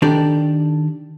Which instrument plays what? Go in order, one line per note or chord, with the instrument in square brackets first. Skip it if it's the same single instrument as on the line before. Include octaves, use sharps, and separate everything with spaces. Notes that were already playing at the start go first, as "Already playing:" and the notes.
[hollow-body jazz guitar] D#3 D4 G4 A4 D5